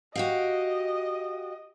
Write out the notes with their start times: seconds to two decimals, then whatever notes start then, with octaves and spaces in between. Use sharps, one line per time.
0.16 F#4 G4 D#5 F5